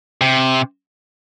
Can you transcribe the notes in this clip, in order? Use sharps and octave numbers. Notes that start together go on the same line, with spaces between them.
C3